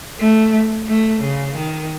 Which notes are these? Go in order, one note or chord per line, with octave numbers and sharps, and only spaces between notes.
A3
A3
C#3
D#3